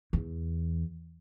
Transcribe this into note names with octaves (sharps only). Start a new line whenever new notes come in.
E2